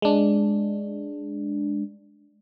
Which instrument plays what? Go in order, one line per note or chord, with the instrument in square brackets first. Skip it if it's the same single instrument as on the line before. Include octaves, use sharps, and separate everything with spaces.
[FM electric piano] G#3 D4